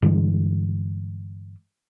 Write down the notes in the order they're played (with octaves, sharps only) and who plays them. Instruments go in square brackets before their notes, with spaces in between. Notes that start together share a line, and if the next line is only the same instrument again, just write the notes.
[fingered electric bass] G2 D3 E3 G#3